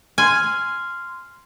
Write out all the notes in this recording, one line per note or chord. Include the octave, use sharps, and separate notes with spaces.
G#5 C6 F6